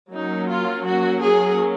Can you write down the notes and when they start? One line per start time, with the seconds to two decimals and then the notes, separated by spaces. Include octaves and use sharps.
0.11 F#3 A#3 C#4 D#4
0.48 F4
0.85 F#4
1.21 G#4